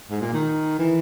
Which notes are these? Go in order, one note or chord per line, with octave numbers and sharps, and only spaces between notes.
G#2
A#2
D#3
E3